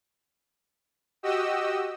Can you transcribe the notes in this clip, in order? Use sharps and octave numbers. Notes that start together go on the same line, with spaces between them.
F#4 G4 D#5 E6